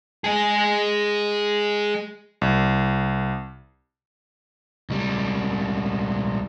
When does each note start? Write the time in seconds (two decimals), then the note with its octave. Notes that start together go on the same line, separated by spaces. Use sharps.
0.24 G#3 G#4
2.41 C2
4.90 C#2 G3